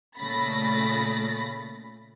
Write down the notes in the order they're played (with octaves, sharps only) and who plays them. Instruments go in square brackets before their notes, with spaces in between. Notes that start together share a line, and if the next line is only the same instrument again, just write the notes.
[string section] A#2 C#3 A3 B5 A6 A#6